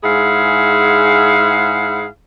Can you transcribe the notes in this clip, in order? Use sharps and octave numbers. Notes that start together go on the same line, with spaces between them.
G#2 E4 G#4 F5 F#5